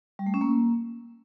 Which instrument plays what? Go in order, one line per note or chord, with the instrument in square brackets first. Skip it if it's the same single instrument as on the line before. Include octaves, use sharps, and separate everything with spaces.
[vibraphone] G3
A3
C#4
A#3